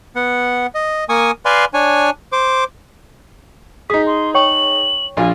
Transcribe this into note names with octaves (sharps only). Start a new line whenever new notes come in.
B3 F#5
D#5
A#3 G#5 C#6 D#6
B4 D5 F5 G#5 C6
D4 C#5 G#5
C5 D6
D#4 G#4 D#6 B6
C6
C#5 G5 C#6 F#7
A#1 F4 G#5